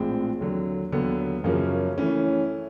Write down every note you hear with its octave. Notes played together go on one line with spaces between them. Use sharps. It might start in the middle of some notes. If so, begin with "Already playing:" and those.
Already playing: A#1 A2 F3 G#3 C4
D#2 D3 F#3
D#2 D3 F#3 B3
F#2 C#3 F3 A#3 C#4
E3 A3 C#4